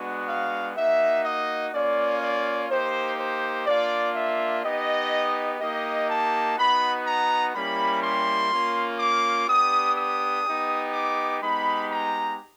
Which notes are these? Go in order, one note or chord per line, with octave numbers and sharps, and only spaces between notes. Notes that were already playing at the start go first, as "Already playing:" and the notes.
Already playing: G#3 B3 D4 F#4
F5
A#3 D#4 F#4 E5
D#5
A#3 C#4 F4 D5
D5
A#3 D#4 G4 C5
C5
A#3 D4 F4 D5
E5
B3 D#4 G4 D#5
A#3 D#4 G4 D#5
A5
B3 D#4 F#4 B5
A#5
G3 A#3 C#4 E4 G4 B5
C6
A#3 C#4 F4
D6
B3 D4 G4 D#6
D#6
B3 D#4 G4
D6
G#3 B3 D#4 G4 B5
A#5